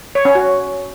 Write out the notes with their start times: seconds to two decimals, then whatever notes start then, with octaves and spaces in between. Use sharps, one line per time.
0.15 C#5
0.25 C#4
0.35 F#4